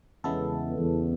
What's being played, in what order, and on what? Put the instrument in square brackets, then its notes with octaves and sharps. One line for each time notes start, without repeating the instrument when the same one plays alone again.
[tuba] E2 [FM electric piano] C#3 G#3 B3 E4 A4
[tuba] E2